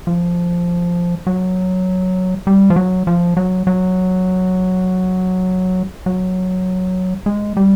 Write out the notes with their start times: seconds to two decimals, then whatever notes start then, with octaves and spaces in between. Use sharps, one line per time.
0.07 F3
1.27 F#3
2.47 G3
2.70 F3
2.76 F#3
3.07 F3
3.37 F#3
3.67 F#3
6.06 F#3
7.26 G#3
7.57 G3